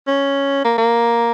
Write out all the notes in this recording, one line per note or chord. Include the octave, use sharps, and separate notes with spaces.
C#4
A#3
A#3